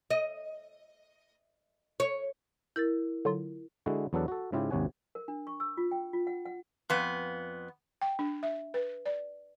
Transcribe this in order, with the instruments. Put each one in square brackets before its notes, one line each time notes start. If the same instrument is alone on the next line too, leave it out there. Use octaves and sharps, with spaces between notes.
[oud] D#5
C#5
[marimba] E4 A#4 [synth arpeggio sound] G6 A6
[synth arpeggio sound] D3 F#3 F4
[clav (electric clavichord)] D3 G#3 E4 F#4
E2 F#3 B3 D4 A4 F#5
F#4 A4
G#2 C#3 E4 F4 G4
G#1 D#2 C3 C#5 F#5 G#5
[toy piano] A#4
D4
C#6
E6
F4
G5
F4
F#5
F#5
[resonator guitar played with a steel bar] F2 B3
[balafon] G5
D4
E5
B4
D5